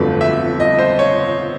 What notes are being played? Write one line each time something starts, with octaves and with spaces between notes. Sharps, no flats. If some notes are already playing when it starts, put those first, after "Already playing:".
Already playing: G1 F2 D3 F#3 A3 B4
E5
D#5
C5
C#5